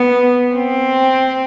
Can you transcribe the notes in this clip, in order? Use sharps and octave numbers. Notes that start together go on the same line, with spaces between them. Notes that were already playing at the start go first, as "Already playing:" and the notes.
Already playing: B3
C4